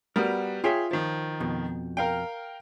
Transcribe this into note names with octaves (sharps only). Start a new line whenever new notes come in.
G3 B3 F#4 A#4
F4 G#4 C#5 E5 G5
D#3 F3
F2 B2
A#4 F5 G5